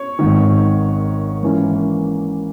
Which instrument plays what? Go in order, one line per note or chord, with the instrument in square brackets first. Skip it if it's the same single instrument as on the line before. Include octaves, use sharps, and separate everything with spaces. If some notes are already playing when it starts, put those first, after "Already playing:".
Already playing: [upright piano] C#5
G#1 G#2 D#3
G#2 E3 A#3 C#4